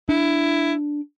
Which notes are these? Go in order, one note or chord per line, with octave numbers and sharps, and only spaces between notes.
D4 E4